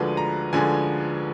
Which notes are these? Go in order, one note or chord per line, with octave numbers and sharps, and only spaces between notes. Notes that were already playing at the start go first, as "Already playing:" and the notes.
Already playing: D2 D3 F3 G#3 B4
A#5
D2 D3 F3 G#3 G#5